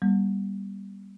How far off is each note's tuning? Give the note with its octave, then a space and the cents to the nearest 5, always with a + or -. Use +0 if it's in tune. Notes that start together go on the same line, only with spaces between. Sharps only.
G3 +0 B3 -45